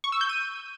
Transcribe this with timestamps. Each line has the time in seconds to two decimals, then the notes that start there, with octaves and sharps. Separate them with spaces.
0.04 C#6
0.12 E6
0.21 G6
0.29 D#7